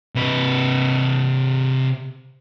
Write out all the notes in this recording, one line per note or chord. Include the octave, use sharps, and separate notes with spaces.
C3 B4